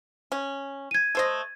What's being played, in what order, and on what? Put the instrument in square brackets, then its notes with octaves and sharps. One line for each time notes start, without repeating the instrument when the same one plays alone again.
[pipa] C#4
[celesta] G#6 D#7
[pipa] A3 C5 D#5